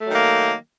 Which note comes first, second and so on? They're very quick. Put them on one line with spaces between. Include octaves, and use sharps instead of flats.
A3 F#3 D#3 A#3